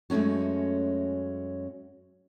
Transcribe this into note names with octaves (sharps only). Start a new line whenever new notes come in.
F#2 G#3 A3 C#4 F#4